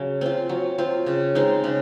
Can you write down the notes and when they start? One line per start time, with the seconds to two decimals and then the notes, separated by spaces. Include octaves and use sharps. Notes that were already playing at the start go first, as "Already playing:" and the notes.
Already playing: C#3 F#3 C#4
0.21 C4 F4
0.49 F#3
0.78 C4 F4
1.06 C#3
1.35 G#3 C4 D#4
1.64 C#3